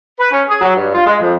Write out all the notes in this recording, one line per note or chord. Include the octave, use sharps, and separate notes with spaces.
B4
C#4
G#4
F#3
G2
F4
G#3
F2